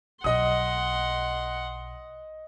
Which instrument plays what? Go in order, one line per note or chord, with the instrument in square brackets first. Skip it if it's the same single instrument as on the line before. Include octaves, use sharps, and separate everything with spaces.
[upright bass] B1 [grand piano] D#5 D#6 [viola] F#5 C6